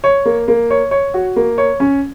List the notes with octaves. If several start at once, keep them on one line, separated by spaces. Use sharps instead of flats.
C#5
A#3
A#3
C#5
C#5
F#4
A#3
C#5
C#4